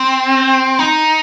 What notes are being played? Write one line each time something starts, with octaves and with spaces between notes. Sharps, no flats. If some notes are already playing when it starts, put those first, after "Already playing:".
Already playing: C4
D#4